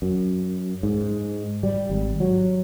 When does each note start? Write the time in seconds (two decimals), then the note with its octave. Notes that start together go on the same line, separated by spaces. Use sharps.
0.02 F#2
0.83 G#2
1.63 G3
1.90 G#1
2.20 F#3